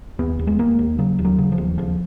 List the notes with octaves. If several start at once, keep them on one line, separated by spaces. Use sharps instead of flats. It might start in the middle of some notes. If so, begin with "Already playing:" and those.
D#2 B3
D#2
G#3
D#2 A#3
D#2
C#3 F#3
D#2
F#3
C#3
F3
D#2
D#2 F3